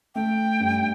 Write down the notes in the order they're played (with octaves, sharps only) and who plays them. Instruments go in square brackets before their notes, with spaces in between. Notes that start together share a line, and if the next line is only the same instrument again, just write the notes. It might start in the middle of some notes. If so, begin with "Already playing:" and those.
[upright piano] A3 [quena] G5
[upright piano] G2